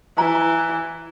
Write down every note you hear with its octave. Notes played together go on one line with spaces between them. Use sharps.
E3 A#5